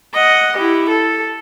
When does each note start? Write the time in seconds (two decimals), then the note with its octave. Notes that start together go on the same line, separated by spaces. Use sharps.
0.14 D#5 F#5
0.57 E4 G4
0.89 A4